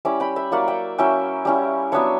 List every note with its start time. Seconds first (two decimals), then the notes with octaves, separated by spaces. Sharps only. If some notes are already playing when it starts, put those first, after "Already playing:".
0.05 G3 C#4 E4 B5 D6
0.20 G5 B5
0.36 E5 G5
0.51 F#3 A#3 E4 D5 F#5
0.68 E5 G5
0.98 F#3 C#4 E4 E5 G5
1.45 G3 C#4 E4
1.92 F#3 B3 D4 C#5 E5